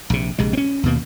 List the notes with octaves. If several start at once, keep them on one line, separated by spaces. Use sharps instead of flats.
A#1 C3
A#1 C3 G#3
C4 C#4
D#2 B2 A#3